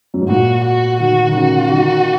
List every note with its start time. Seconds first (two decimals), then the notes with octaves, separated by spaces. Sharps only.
0.14 F#2
0.22 G#2
0.29 A#2 F#4
0.65 F#4
1.00 D#3 F#4
1.29 D#3
1.36 C#3 F#4
1.71 D#3